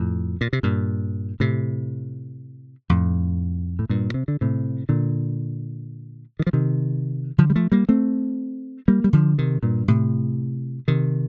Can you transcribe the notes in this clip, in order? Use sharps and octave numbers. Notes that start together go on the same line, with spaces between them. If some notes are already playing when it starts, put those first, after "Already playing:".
Already playing: F2 A2
A#2
C3
G2 A#2
A2 C3
F2 A2
A2
G2 A#2
C3
D3
A2 C3
A#2 D3
D#3
F3
C3 D#3
D3 F3
G3
F3 A3
G3 A#3
A3 C4
G3 A#3
G3
D3 F3
C3 D#3
G2 A#2
A2 C3
C3 D#3